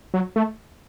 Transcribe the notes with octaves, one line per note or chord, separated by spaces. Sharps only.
F#3
A3